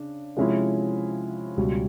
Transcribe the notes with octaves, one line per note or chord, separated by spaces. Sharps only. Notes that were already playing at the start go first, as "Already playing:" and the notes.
Already playing: C#3 D4
C3 F3 G#3 C#4 E4
C#2 B2 G3